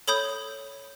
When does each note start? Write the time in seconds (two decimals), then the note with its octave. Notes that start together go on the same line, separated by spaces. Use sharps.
0.08 A4 C#5 B5 D#6 G6